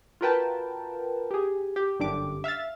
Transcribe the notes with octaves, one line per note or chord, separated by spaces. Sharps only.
F4 F#4 A#4 B4 G5 A5
G4 G#4
G4
G1 F#2 D3 D4 G4 D6
E5 F5 F6 A6